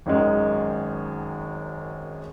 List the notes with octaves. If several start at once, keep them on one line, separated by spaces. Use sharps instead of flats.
G#1 F#2 D#3 G#3